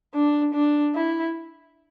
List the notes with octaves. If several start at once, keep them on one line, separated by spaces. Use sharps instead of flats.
D4
D4
E4